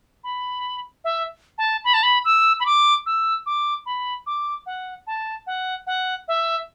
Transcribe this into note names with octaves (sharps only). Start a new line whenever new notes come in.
B5
E5
A5
B5
A5
B5
E6
B5
D6
E6
D6
B5
D6
F#5
A5
F#5
F#5
E5